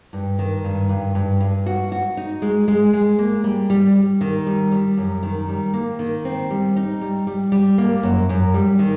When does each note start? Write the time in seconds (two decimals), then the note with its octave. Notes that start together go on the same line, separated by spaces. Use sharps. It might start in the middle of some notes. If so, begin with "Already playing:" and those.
0.13 G2
0.39 D#3
0.64 G2
0.89 G2
1.15 G2
1.41 G2
1.66 F#4
1.92 F#4
2.17 D#4
2.42 G#3
2.68 G#3
2.93 G#3
3.19 A#3
3.44 G3
3.70 G3
3.96 G3
4.21 D#3
4.47 G3
4.71 G3
4.97 F#2
5.23 D#3
5.49 G3
5.74 A#3
5.99 D#3
6.25 C4
6.50 G3
6.76 D#4
7.01 G3
7.27 G3
7.52 G3
7.78 A#3
8.03 F#2
8.29 F#2
8.54 G3
8.79 D#3